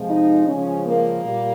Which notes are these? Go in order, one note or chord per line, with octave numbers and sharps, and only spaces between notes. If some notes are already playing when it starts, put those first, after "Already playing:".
Already playing: C3 F3 G#3
D#4
C#3 F3 G#3 C#4
A#3
A#2 G3